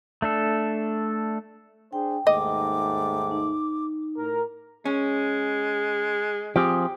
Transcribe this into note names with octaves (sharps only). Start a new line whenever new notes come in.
A3 D4 A4
D4 G#4 C5 G5
D#2 G#2 A3 D#5 D6
D#4
A2 A#4
G#3 C#4
F3 C4 G4 G#4